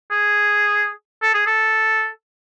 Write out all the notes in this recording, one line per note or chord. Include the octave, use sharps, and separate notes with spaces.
G#4
A4
G#4
A4